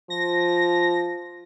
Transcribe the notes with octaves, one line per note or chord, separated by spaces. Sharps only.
F3 A#6